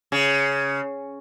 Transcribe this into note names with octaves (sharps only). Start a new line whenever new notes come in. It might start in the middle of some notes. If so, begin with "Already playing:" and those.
C#3